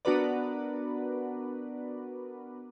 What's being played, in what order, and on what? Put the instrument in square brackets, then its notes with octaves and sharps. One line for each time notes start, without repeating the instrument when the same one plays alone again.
[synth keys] B3 D4 F#4 A#4 B4 D5